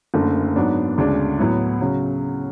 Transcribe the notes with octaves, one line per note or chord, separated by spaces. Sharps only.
F#1 F#2 D3 A3
G#2 F#3 B3 D4
D2 C#3 G#3 D4
A2 F#3 B3 E4
C#3 F#3